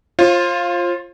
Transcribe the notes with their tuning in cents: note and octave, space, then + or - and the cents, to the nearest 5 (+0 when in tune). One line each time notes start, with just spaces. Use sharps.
F4 +0 C5 +40